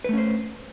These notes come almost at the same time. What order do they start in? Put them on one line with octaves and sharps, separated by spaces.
B4 A3 C#4 C5